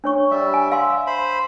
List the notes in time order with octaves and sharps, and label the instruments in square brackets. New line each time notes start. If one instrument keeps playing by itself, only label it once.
[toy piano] D4 C#5 C#6
[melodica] G3 E5
[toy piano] G#5
[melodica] E5 [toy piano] F5 C6
[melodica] C5 B5